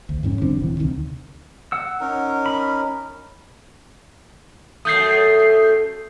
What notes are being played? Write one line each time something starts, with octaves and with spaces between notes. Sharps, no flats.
D2
F2 G#2 C#4
D3 G3 C4 D4
D#1 C3 E3
D2 C3 D#3
F#5 E6
C#4 D#4 A#4
B5
F#2 A3 D#6 G6 C7